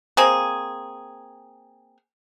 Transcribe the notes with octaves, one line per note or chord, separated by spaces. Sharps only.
A#3 C4 G#4